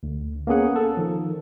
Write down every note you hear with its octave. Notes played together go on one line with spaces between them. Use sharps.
D2
A#3 B3 C#4 G#4 F#5
A4
D#3 F3